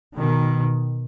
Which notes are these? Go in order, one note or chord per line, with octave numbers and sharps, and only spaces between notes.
B2 D#3